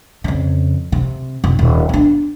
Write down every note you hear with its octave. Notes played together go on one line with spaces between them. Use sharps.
F2 C#3
C3
F1
D#1
B3 D4